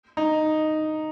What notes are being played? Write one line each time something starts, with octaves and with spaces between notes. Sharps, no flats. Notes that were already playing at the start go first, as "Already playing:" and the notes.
D#4